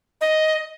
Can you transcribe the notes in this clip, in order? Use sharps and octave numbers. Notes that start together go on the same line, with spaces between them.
D#5